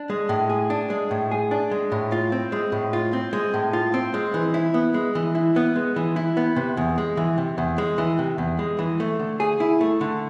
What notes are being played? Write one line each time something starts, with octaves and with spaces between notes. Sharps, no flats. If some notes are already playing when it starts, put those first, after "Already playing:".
Already playing: D4
G#3
A2
G#4
D4
G#3
A2
G#4
D4
G#3
A2
F4
C4
G#3
A2
F4
C4
G#3
A2
F4
C4
G#3
E3
E4
B3
G#3
E3
E4
B3
G#3
E3
E4
B3
C3
E2
G#3
E3
C3
E2
G#3
E3
C3
E2
G#3
E3
A3
D3
G#4
E4
A3
D3